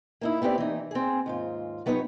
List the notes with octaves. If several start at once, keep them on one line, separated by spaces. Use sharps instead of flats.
A#3 D#4 E4
B3 C4 E4 G4 D5
E3 D#4
C4 G#4
D#2 G#2 F4
F#3 B3 D#4 G4 C#5